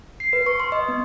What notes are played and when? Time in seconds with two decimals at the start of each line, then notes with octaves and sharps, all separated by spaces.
0.20 C7
0.33 B4
0.46 C#6
0.60 C6
0.72 D#5
0.88 B3